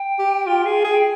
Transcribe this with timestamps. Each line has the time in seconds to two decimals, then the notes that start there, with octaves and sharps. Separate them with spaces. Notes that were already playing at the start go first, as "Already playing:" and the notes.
Already playing: G5
0.19 G4
0.46 F4
0.65 G#4
0.84 G#4
0.91 G5